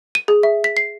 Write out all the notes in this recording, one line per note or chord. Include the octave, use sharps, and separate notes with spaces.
D#7
G#4
E5
B6
C7